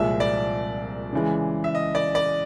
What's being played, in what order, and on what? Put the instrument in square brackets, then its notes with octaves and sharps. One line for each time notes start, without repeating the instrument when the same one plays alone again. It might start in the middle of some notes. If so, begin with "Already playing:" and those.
Already playing: [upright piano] C2 A#2 F3 G#3 [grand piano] E5
[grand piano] D5
[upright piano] C#3 E3 G#3
[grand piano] E5
D#5
D5
D5